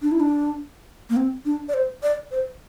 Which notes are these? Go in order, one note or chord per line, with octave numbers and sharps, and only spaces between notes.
D4
E4
D4
A#3
C4
D4
D5
C5
D5
C5